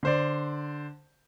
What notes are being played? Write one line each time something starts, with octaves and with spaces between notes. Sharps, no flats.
D3 C5 D5